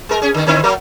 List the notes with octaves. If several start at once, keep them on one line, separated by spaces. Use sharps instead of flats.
G#3 A#4
C#4 G#4
D3 D#3
D3 C4 E4
F#3 A#3 A#4